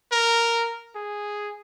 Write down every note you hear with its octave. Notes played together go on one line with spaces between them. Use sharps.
A#4
G#4